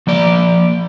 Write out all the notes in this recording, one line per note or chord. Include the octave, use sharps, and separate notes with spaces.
F3 A#3 D5